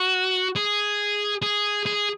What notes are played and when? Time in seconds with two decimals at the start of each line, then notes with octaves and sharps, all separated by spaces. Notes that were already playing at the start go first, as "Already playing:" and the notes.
Already playing: F#4
0.56 G#4
1.42 G#4
1.86 G#4